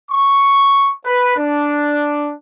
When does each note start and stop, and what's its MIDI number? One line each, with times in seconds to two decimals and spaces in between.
0.11 0.91 85
1.06 1.36 71
1.37 2.33 62